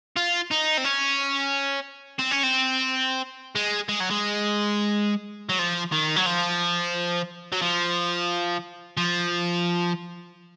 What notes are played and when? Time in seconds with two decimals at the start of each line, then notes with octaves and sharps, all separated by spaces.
0.16 F4
0.51 D#4
0.77 C4
0.84 C#4
2.19 C4
2.32 C#4
2.44 C4
3.55 G#3
3.89 G#3
4.00 F#3
4.11 G#3
5.49 F#3
5.59 F3
5.92 D#3
6.16 F#3
6.26 F3
7.52 F#3
7.62 F3
8.97 F3